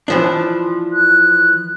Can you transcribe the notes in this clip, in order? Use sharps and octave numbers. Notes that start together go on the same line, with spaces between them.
E3 F3 D4
F#6